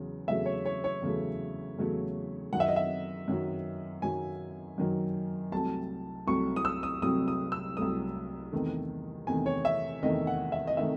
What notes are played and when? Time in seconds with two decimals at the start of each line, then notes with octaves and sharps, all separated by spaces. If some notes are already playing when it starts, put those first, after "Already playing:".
Already playing: E2 C#3 F#3
0.27 E2 C#3 F#3 A3 E5
0.46 C#5
0.66 C#5
0.84 C#5
1.02 E2 C#3 F#3 A3
1.78 E2 C#3 F#3 A3
2.52 F#2 D#3 F#3 F#5
2.60 E5
2.68 D#5
2.76 E5
3.28 F#2 D#3 F#3
4.02 F#2 D#3 F#3 G#5
4.78 F#2 D#3 F#3
5.52 C2 C3 F#3 A3 A5
6.27 C2 C3 F#3 A3 C#6
6.56 D#6
6.65 E6
6.83 D#6
7.02 C2 C3 F#3 A3 D#6
7.28 D#6
7.52 E6
7.77 C2 C3 F#3 A3 D#6
8.52 E2 C3 D#3 A3
9.27 E2 C3 D#3 A3 G#5
9.46 C#5
9.65 E5
10.02 E2 C3 D#3 A3 D#5
10.27 F#5
10.52 E5
10.67 D#5
10.77 C3 D#3 A3 E5